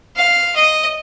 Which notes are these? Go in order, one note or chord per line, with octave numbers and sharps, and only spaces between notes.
F5
D#5